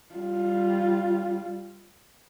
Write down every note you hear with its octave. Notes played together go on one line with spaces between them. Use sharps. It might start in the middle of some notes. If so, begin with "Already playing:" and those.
G3 F4